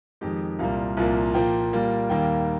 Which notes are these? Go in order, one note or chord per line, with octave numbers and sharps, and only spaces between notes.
F2 D#3 G#3 G4
C2 A#2 G3 A#3 F5
C2 A#2 F3 A#3
A#2 F3 A#3 G5
A#2 G3 A#3
D#2 D#3 G3 A#3 G5